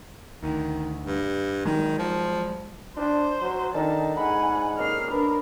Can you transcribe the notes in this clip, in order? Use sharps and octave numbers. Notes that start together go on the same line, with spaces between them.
D2 D#3
G2
D#3 F#3 G#3
F3
D4 C5
F#3
D#3 D4 A4 A5 A#5
G#2 F#5 G#5 B5
A#3 C#4 D#5 F6 C7
D4 A#4 B4